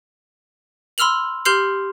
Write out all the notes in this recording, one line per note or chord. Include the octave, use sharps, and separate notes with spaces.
B5 C6 E6 F6 F7 F#7
G4 C6 F6 G6 C7 F#7